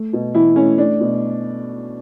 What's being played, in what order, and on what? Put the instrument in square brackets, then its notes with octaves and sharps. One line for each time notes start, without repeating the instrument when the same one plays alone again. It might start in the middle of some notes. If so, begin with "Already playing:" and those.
Already playing: [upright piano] A3
B2
B2 E3 E4
A3 C#4
A3 D4
B2